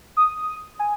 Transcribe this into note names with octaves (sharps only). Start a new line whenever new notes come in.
D#6
G#5